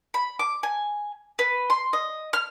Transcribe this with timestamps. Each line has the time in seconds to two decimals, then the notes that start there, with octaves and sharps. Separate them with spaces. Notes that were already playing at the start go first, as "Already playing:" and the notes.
0.14 B5
0.39 D6
0.63 G#5
1.39 B4
1.70 C6
1.93 D#5
2.33 F6